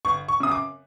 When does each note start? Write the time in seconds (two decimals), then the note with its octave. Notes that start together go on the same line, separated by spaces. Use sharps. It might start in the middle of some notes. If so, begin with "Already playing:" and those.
0.05 G1 C#6
0.28 C#6
0.40 F#2 C#3 D#6
0.51 D6